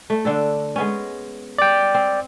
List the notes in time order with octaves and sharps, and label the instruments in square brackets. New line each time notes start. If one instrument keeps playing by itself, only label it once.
[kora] A3
D3 D4 A4
G#3 B3 C#4
[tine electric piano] D5 G5
[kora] C4